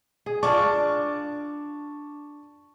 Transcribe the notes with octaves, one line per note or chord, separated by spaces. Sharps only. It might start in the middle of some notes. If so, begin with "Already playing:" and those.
G#4
D4 F4 A5 C#6 D6